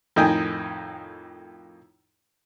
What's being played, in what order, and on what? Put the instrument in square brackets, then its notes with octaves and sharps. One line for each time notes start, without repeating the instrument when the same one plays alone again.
[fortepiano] F2 A2 D#3 D#5 G5 G#5